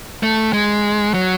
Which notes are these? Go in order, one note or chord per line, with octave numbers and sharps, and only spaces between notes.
A3
G#3
F#3